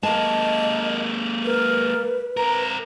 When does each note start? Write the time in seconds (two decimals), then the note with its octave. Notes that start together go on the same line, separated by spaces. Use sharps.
0.03 G#3 A#3 D#5 A5
1.45 A#4 B4
2.37 C4 A#4 A#5